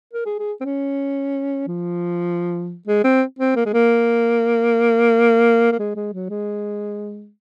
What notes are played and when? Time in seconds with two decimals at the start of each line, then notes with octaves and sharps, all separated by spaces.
0.13 A#4
0.26 G#4
0.39 G#4
0.61 C4
0.65 C#4
1.67 F3
2.87 G#3
3.04 C4
3.39 C4
3.56 A#3
3.66 G#3
3.73 A#3
5.72 A#3
5.79 G#3
5.95 G#3
6.13 F#3
6.30 G#3